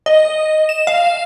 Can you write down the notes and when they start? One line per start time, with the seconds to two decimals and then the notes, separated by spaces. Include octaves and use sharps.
0.06 D#5
0.69 E7
0.87 F5